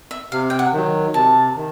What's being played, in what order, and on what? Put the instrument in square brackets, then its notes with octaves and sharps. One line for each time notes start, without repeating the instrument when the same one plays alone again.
[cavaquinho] E5
[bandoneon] C3 [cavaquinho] F5
[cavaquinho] G5
F#5
[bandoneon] D#3 F#3
[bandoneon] C3 [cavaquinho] A5
[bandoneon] D#3